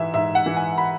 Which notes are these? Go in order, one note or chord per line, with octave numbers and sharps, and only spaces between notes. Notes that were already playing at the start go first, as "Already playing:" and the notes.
Already playing: G#2 E3 E5
G#2 E5
F#5
E3
G#5
B5